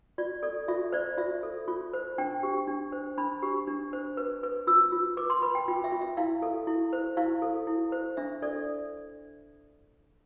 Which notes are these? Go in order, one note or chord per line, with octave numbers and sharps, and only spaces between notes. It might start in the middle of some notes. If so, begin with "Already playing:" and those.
F4 D5
A4 D5
F4 E5
C5 D5
F4 E5
A4
F4
C5
D4 G5
G4
D4
C5
D4 B5
G4
D4
C5
B4
B4
F4 E6
F4
B4 D6
C6
B4 B5
G5
F4 G5
E5
F4
E5
E4 F5
A4
E4
C5
E4 F5
A4
E4
C5
D4 E5
A4 D5